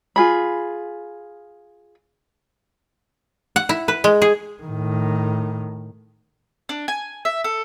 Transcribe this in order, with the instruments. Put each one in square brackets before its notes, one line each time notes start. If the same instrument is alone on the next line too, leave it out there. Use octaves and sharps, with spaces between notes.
[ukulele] F4 G#4 B5
[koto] F#5
E4
B4
G#3
G#4
[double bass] A2 D#3
[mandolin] D4
G#5
E5
A4